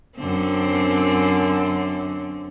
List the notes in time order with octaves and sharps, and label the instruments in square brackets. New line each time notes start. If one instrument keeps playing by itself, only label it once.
[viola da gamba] F#2 D3 C4